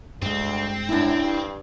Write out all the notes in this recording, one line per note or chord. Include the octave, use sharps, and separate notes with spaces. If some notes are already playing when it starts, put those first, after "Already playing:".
D2 G2 G#3 C4
F#2 D4 E4
G2